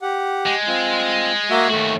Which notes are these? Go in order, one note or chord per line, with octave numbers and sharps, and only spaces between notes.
G4 F#5
G#3
C4 F4
A#3 F#4 E5
D#2 A3 F#4